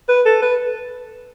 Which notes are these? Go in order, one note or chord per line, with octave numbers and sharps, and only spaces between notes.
B4
A4
B4